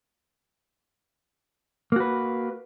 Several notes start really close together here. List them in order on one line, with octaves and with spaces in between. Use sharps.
A#3 F#4 B4